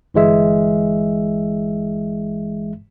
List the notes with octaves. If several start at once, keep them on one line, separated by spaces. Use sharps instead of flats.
G1 E3 G#3 E5